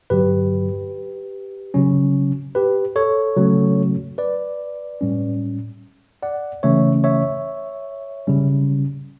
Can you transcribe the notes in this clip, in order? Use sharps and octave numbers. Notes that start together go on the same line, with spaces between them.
G2 D3 F#3 G4 B4
C#3 F#3 C#4
G4 B4
A4 C#5
C#3 F#3 A3 C#4
B4 D5
A2 G3 C#4
D5 F#5
C#3 E3 A3 C#4 C#5 E5
C#5 E5
C#3 G3 C#4